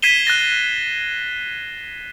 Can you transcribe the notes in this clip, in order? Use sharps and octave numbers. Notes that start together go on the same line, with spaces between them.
G#6 B6 C7 D#7 E7 G7
F#6 A6 A#6 G7